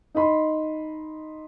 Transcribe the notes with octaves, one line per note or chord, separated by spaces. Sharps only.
D#4 D#5 B5 C6